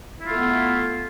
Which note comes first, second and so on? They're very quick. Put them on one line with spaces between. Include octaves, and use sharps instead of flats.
E4 F4 A3 B3